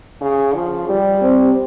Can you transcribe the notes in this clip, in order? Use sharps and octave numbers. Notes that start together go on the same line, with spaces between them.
C#3
F3
G3
C4